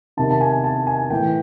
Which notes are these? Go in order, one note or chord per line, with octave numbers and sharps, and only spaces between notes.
C3 D#3 A5
A5
G#5
A5
G#5
A2 E3 G5